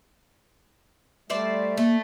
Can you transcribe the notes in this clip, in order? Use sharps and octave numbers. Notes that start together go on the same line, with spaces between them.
G3 A3 C5 D5 E5
A3 A#3